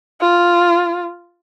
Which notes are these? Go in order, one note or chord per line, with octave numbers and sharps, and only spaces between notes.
F4